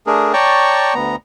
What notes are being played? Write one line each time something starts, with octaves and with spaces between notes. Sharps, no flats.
A3 D4 G#4 A#4
C#5 D5 G5 A5 A#5 C#6
D2 B3 A#5